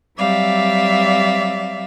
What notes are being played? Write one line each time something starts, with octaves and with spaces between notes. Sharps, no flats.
F#3 G3 C4 D5 E5 F5